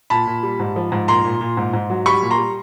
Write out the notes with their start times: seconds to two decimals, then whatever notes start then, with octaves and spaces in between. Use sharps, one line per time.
0.10 A#2 A5 B5
0.27 A#2
0.43 G3
0.60 G#2
0.76 F3
0.92 G#2
1.08 A#2 A#5 C6
1.25 A#2
1.41 A#2
1.57 G#2
1.73 G#2
1.90 F#3
2.06 G3 B5 C#6
2.22 A#2
2.31 A#5 C6
2.38 G3